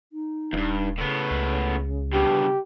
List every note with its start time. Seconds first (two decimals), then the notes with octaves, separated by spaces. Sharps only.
0.13 D#4
0.53 D#1 E2 G2
0.98 A2 C#3 B3
1.31 C#2
2.13 G2 B2 G4